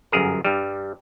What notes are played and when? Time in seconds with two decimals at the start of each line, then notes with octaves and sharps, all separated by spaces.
0.12 G1 F#2 G#4 A#4
0.45 G2 G3